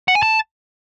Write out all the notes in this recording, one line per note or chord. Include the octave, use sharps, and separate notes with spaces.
F#5
G#5
A5